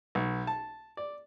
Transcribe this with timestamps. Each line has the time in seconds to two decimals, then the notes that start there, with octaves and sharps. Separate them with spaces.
0.15 B1
0.47 A5
0.97 D5